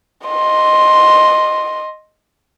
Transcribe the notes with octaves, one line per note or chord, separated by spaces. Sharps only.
D#5 C6